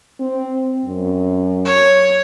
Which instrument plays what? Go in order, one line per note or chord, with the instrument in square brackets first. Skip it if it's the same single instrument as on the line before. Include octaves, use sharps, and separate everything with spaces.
[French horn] C4
F#2
[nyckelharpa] C#5